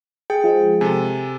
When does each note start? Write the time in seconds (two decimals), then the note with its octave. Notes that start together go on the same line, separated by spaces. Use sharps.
0.30 G#4 G5
0.44 F3 G#3
0.81 C3 A4 G#5